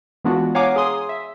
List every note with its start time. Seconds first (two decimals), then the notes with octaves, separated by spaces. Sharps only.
0.25 E3 G#3 B3 D4 F4 F#4
0.55 C#5 F5 F#5 G#5 A#5 D6
0.76 G#4 G#5 C6 D#6
1.09 E5